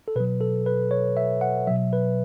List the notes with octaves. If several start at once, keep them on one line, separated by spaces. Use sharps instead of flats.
A4
B2 F#3 B4
A4
B4
C#5
E5
F#5
B2 F#3 E5
B4